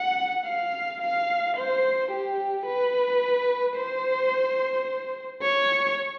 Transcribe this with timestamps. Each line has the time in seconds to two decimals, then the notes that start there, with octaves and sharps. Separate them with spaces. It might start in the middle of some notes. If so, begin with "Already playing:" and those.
Already playing: F#5
0.46 F5
1.01 F5
1.57 C5
2.11 G4
2.67 B4
3.76 C5
5.42 C#5